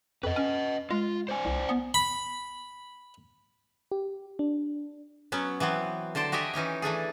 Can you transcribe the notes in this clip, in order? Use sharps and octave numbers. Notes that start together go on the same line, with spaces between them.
F2 B4 D#5
C#4
G#3 F4
C5 D5 G#5
C2
B3
B5
G4
D4
F#3 B3 C#4
E3 F#3 B3 C4
D3 C5 D5 A5
F#4 G4 D#5 E5 G#5
E3 C#4 D#4 G4
E3 A3 D4 G#4